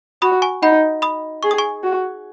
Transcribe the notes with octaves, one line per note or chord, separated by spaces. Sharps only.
F#4 B5 D#6
G#5 C#6
D#4 F#5 B5
B5 D#6
G#4 C#6
D#6
G#5 C#6
F#4